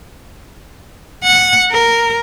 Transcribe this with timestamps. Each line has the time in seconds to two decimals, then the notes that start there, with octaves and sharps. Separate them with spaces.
1.24 F#5
1.72 A#4